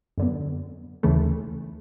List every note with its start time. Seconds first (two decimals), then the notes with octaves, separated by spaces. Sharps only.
0.18 F#2 D3 F#3 B3
1.03 D#2 C#3 E3 A3